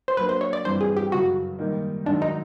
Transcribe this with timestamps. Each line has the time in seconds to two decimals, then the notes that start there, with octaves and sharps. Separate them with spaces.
0.08 C5
0.17 F#3 A#3 D4 B4
0.29 C5
0.41 C#5
0.53 D5
0.65 G2 E3 G3 C4 C5
0.81 G#4
0.97 G4
1.12 F#2 C#3 F#3 F#4
1.58 G#2 D#3 G3 A#3 D#4
2.05 G#2 D#3 F#3 D4
2.22 D#4